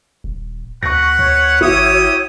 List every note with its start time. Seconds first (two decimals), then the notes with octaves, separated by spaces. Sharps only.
0.24 D#1
0.83 D2 B4 F#5 C#6 A#6
1.19 D2 C#5
1.61 G#1 E4 F#4 G4 D#6